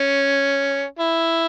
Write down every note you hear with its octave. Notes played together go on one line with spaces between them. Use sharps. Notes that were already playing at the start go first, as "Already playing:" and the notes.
Already playing: C#4
E4